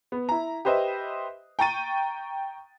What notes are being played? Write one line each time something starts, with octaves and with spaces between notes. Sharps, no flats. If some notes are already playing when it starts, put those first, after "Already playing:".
B3
E4 A#5
G4 B4 C5 D#5 E5
G5 A#5 C#6 A6 D#7